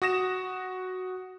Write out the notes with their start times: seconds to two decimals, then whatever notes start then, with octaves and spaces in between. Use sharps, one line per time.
0.02 F#4 D#6 A#6 E7